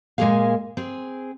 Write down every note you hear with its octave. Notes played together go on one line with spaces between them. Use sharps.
A#2 G#3 A#3 C#4 G#4 F5
C4 G#4